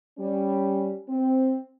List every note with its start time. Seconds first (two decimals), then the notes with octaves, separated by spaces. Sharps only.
0.19 G3 C#4
1.09 C4